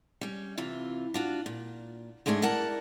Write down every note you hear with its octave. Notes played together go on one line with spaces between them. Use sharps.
G3 C#4
C3 E3 F4
D4 F4 F#4
A#2
G#2 G#3 A3 D4 A#4 G#5
E3 A#4 D5 F#5 A5